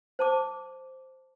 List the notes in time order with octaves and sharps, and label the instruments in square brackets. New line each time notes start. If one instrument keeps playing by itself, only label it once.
[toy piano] C5 A5 D6